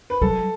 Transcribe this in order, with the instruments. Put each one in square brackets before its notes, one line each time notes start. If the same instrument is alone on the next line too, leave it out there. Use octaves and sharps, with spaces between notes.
[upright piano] B4
[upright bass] F#3 [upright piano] A4